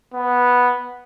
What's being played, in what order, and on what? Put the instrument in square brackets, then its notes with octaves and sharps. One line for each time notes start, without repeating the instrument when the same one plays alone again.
[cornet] B3